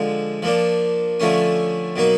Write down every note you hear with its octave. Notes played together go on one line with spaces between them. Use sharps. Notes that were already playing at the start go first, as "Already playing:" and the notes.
Already playing: D3 F3 G#3
F3 A#3 D4
D3 F3 A3 C#4
B2 F#3 A#3 D#4